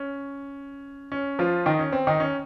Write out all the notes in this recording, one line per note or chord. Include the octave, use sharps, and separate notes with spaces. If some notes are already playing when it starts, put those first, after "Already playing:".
Already playing: C#4
C#4
F3 F4
D#3 D#4
C#4
C4
D#3 D#4
C#4